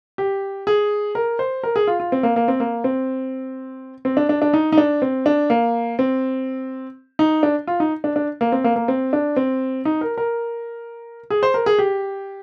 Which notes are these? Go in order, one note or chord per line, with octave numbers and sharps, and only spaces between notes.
G4
G#4
A#4
C5
A#4
G#4
F4
F4
C4
A#3
A#3
C4
A#3
C4
C4
D4
D4
D4
D#4
D#4
D4
C4
D4
A#3
C4
D#4
D4
F4
D#4
D4
D4
A#3
C4
A#3
A#3
C4
D4
C4
D#4
A#4
A#4
G#4
C5
A#4
G#4
G4